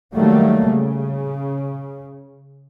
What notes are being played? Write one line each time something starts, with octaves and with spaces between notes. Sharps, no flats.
D#3 F#3 G3 A3 A#3
C#3